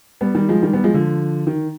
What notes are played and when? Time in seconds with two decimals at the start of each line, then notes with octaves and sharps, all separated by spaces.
0.21 G3 B3
0.35 D#3 G3
0.49 F3 G#3
0.62 D#3 G3
0.73 G3 B3
0.84 F3 G#3
0.94 D3 F3
1.47 D#3